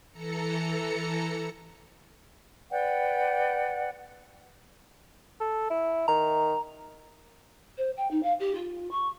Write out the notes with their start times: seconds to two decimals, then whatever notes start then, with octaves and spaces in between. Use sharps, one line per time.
0.11 E3 A4 A#5 C#7
2.71 B4 D5 F#5 G5
5.40 A4
5.70 E4
6.08 D#3 A#5
7.78 C5
7.97 G5
8.11 D#4
8.23 F5
8.40 G4
8.55 F4
8.91 C#6